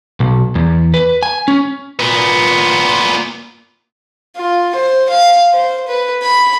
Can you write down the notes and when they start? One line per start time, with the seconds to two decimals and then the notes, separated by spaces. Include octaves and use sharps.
0.20 B1
0.55 E2
0.94 B4
1.23 G#5
1.48 C#4
1.99 A#2 B3
4.37 F4
4.75 C5
5.10 F5
5.52 C5
5.88 B4
6.23 B5